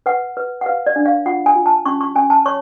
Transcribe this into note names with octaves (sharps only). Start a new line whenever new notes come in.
B4 F#5
B4
F#5
B4 F5
D5
D4
F5
F4 F#5
G#5
F4
A5
C#4 C#6
C#6
C#4 G#5
A5
C#5 C#6